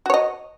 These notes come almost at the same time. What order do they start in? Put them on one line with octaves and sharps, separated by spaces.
F#4 C#5 D#5